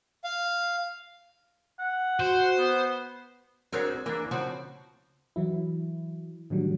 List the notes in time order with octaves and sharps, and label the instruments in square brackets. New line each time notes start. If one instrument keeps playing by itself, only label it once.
[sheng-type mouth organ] F5
[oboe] F#5
[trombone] F#4 [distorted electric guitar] C5
[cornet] B3
[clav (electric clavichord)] C4 D4 G#4 [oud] F#4 A#4 C#5
[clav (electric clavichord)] E3 D4 [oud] A#3
[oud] C#3 C4 F#4 [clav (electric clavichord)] F3
[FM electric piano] E3 F#3 E4
A2 D3 D#3 F#3 G3